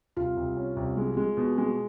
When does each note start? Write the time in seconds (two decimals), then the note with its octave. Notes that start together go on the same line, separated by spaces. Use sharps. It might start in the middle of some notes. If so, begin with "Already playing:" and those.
0.16 C2 F4
0.37 C2
0.56 C#4
0.77 C2
0.97 G#3
1.17 G#3
1.37 B2
1.58 G#3